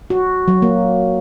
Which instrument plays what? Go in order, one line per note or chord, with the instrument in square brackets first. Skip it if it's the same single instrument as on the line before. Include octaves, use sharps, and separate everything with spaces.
[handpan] F#4
F#3
A#3